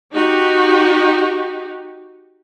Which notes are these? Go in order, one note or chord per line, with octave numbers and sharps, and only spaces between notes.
D#4 F#4 G4